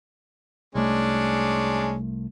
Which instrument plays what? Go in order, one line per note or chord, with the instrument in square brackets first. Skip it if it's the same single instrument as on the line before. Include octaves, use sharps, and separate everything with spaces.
[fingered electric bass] C2 A3 [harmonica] G#3 C#4 D4